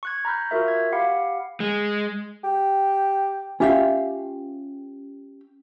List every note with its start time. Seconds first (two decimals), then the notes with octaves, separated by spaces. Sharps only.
0.03 C#6 F#6 G#6
0.25 A#5 B5 F6 G6
0.51 F4 F#4 A#4 E5
0.68 G#6
0.92 G4 F5 F#5 B5
1.60 G#3
2.44 G4
3.60 C#4 F4 G4 E5 F5 G5